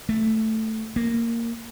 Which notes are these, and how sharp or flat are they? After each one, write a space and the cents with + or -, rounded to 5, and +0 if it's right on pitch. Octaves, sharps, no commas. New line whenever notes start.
A3 +5
A#3 -10